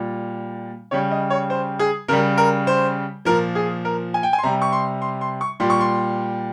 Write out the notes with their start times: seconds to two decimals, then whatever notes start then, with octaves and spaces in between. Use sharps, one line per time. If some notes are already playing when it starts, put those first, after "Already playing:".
Already playing: A#2 G3
0.91 C#3 G3 C#5
1.11 D#5
1.30 C#5
1.50 C5
1.79 G#4
2.08 C#3 G3 A#4
2.38 A#4
2.67 C5
3.25 A#2 F3 A#4
3.55 G#4
3.85 A#4
4.14 G#5
4.23 G5
4.33 G#5
4.38 C6
4.43 C3 G3 A#5
4.62 C#6
4.73 C6
5.02 C6
5.21 C6
5.41 C#6
5.60 A#2 G3 C6
5.70 C#6
5.81 C6